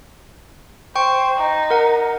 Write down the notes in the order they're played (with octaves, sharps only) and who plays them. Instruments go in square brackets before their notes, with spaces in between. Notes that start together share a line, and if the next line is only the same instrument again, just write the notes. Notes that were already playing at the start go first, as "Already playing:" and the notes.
[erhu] C5 [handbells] G5 C#6
[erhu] D#4
[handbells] A#4 F#5